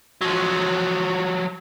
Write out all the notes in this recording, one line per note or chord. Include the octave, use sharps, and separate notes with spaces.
F3 F#3